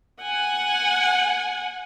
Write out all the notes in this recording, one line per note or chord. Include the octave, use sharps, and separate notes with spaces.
F#5 G#5